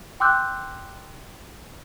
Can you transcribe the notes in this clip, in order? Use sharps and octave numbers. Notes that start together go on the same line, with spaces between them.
G5 C6 D6 E6 F#6 G6